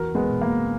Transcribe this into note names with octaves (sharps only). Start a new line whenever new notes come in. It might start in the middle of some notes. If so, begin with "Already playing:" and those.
Already playing: E2 F#4 A#4
G#3 B3
B2
A#3